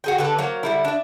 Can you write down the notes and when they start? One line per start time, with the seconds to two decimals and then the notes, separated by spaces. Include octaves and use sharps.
0.04 F#4 G#4 G5
0.18 D3 G4 A4 B4
0.39 F#3 A#3 C5
0.63 D3 G3 E4
0.85 D4 E5